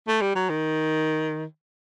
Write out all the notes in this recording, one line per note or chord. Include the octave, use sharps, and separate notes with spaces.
A3
G3
F#3
D#3